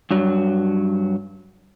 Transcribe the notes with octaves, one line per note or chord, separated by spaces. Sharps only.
G2 F#3